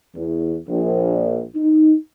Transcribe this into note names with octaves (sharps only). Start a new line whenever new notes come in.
E2
A#1
D#4